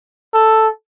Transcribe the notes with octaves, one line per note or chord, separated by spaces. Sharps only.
A4